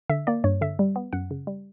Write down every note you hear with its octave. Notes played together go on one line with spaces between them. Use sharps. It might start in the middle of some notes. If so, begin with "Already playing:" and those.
D3 E5
A#3 D5
G2 C#5
D3 E5
G3
B3
F#2 F#5
C#3
G3